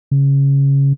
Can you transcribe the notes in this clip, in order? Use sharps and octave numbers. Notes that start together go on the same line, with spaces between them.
C#3